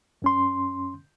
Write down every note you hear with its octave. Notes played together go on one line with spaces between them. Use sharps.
F#2 C#4 C6